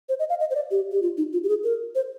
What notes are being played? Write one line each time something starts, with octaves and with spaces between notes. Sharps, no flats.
C5
D#5
F5
D#5
C5
D5
G4
G4
F4
D#4
F4
G4
G#4
A#4
C5